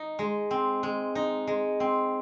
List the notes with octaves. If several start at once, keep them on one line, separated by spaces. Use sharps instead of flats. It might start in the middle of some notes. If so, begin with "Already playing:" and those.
Already playing: D#4
G#3
C4
G#3
D#4
G#3
C4